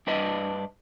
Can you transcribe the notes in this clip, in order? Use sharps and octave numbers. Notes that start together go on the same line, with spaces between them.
G2 D4 B4 D#5